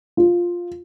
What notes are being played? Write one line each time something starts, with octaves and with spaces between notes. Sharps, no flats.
F4